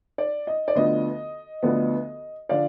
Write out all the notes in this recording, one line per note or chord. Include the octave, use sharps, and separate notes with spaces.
D5
D#5
D5
D2 D3 F3 B3 D#5
D2 D3 F3 B3
D3 F3 D5 F5